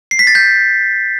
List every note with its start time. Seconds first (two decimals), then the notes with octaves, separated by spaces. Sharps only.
0.11 C7
0.19 B6
0.27 A6
0.35 G6